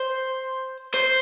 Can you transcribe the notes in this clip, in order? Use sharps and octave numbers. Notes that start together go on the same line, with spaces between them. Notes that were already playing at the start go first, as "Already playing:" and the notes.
Already playing: C5
C5